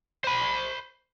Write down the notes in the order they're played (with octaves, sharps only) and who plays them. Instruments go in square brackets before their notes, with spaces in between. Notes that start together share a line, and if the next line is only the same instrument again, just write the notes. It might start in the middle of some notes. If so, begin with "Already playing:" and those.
[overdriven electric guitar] C5 B5